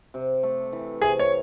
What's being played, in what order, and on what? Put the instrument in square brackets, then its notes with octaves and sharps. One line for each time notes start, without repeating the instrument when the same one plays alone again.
[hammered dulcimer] C3
A3
E3
[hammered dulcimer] C3 [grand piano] G#4
[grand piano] C#5